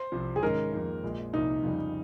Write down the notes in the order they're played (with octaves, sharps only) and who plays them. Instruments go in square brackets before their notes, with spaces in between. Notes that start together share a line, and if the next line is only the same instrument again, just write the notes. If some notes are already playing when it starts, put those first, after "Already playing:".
Already playing: [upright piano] C5
[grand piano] C2 C3 F3
[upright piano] G#4
[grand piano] G#2 D#3 G#3 C#4 [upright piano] A#4
[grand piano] F2 D#3 A#3
A#1 A#2 G#3
[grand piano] C2 A#2 F3 [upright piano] D#4
[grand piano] F2 C#3 G3